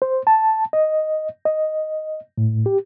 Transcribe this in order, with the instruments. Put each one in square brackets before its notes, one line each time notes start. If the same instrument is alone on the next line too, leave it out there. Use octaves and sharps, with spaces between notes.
[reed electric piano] C5
A5
D#5
D#5
A2
G4